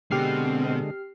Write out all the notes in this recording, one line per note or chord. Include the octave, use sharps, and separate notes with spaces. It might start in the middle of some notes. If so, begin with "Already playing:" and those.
B2 D3 G#3 C4 G4 F6 C7